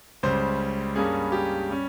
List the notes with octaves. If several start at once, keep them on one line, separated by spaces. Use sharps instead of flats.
C#2 C#3 G3 C#4 C5
G2 G3 A#3 C#4 G#4
G4
G3 C#4